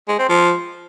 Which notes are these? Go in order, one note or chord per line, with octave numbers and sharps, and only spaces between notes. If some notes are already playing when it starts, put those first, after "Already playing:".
G#3
C4
F3